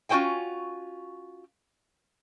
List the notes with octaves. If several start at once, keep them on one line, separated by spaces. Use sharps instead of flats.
C#4 F4 F#4 C5 G5 G#5